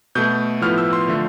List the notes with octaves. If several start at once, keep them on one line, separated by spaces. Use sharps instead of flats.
B2 A3 G6
A2 F3 B3 F6
E6
C6
D3 F3 A3